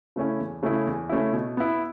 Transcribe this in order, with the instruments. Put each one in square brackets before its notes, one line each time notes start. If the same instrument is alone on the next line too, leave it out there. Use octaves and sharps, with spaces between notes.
[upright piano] C#3 A3 C#4 E4
E2
C#3 A3 C#4 E4
E2
C#3 A3 C#4 E4
B2
B3 E4